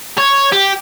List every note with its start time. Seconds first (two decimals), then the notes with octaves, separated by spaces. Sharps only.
0.18 C#5
0.52 G4